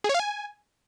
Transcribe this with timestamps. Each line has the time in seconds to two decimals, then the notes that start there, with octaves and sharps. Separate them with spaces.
0.04 G#4
0.09 C#5
0.14 F5
0.20 G#5